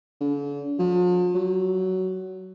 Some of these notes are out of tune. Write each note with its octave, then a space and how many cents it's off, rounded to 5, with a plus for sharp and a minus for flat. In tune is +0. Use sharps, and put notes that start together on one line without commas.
D3 -45
F3 +45
F#3 +15